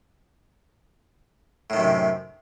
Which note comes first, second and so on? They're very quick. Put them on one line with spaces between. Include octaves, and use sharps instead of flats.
A2 D#3 F#2 C3